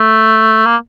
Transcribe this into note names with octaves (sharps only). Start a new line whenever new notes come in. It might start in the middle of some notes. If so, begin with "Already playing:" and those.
Already playing: A3
A#3